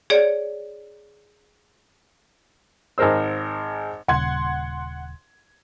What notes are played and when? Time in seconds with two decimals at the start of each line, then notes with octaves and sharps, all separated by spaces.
0.10 G#4 C#5 D5
2.98 G#1 G#3 A#4 C5 E6
4.08 D#1 C#3 F#5 C6 G#6